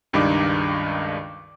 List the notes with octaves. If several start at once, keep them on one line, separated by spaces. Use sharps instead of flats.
C#2 G2 D#3 D4 D#4 D6